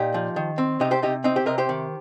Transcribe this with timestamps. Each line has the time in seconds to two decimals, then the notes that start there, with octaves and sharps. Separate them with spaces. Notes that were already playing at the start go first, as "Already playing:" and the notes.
Already playing: A#2 D#4 G4
0.14 F3
0.36 D#3
0.58 C4
0.80 C3 D#4 G4
0.91 G4 C5
1.02 C3 D#4 G4
1.24 C4 D#4
1.36 G4 C5
1.46 C3 A#4 D#5
1.58 G4 C5
1.69 D#3